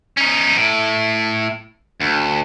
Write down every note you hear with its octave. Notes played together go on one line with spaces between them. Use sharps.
C#4 D#4
A2
D2